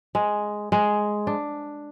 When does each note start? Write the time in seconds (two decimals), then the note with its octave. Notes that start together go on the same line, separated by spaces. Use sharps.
0.15 G#3
0.72 G#3
1.27 D4